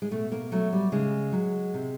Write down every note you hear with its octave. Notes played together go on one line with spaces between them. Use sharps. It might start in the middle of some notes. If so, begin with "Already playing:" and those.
G#3
B2 A3
A#3
F#3 A3
G3
C#3 G#3
F#3
C3